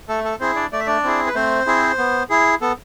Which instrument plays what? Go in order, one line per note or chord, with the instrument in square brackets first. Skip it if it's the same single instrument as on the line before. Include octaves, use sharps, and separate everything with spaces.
[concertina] A3 A4
A4
C4 E4 G#4 C5
D4 D5
A3 D5
E5
D4 D5
C4 E4 G#4
B4
A3 C4 C5
C4 E4 G#4
B3
E4 G#4
B3 A4